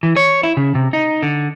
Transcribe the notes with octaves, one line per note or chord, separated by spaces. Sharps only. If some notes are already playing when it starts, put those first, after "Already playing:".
E3
C#5
E4
C#3
C3
D#4
D3